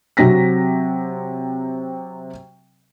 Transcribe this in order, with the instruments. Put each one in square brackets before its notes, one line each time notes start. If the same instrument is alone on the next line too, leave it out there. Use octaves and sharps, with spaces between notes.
[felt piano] C3 F#3 C4 A#6 B6